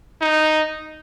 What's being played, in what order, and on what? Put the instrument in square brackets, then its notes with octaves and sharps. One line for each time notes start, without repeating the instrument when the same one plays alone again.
[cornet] D#4